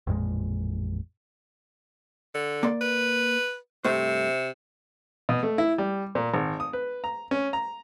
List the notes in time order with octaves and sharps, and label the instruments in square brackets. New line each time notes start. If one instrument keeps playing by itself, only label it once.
[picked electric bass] A1 F2 A#2 G#3
[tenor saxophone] D3
[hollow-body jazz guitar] A#3 D5 C6
[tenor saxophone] B4
[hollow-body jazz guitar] G2 A3 C5 [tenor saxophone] C3
[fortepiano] B2
A3
E4
G3
A#2
G#1
D#6
B4
A#5
C#4
A#5